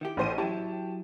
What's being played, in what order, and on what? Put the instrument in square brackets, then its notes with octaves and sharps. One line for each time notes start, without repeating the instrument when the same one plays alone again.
[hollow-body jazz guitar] D#3 E4 G4
[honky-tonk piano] A1 C5 D#7
[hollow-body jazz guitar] F#3 E4 [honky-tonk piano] G4 A5